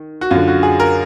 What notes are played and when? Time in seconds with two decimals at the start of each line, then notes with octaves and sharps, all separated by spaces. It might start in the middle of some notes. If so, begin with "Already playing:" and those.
Already playing: D#3
0.21 F#4
0.31 F#2 D3 F4
0.48 F#4
0.63 G#4
0.80 A#4